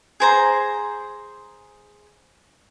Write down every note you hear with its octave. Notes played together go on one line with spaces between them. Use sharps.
G#4 C5 A#5